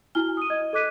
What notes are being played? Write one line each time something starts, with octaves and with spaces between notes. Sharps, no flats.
E4 F#4 G#5 F6 G7
D#6 D#7
D#5 G#6
A4 D#5 D6 F#6 B6 D#7